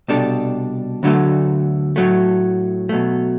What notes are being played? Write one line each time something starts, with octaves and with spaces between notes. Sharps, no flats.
C2 B2 G3 D4 A4
D2 D3 F#3 A3
A2 F#3 A3
B2 F#3 A3